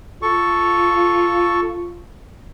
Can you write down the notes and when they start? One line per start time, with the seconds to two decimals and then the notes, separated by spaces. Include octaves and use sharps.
0.22 F4 A4 C#6